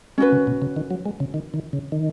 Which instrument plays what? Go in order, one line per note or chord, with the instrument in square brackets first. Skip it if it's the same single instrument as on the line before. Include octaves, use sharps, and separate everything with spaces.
[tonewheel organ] G#3 [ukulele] C#4 F#4 B4
[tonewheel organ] C#3
B2
C#3
D#3
F#3
G#3
C#3
D#3
D#3
C#3
D#3